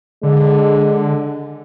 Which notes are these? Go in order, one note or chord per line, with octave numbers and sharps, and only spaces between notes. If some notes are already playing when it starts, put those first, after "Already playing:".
D3 G#3